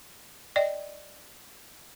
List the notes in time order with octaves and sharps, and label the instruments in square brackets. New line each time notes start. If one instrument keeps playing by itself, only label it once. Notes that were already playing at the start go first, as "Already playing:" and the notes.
[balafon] D5 D#5 G5